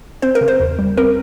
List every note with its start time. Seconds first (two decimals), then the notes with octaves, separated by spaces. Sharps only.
0.22 C4 C5
0.35 A#4
0.41 C#3
0.48 C5
0.60 E2
0.79 G3
0.97 C4 A#4